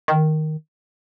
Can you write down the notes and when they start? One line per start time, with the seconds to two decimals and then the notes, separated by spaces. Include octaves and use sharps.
0.08 D#3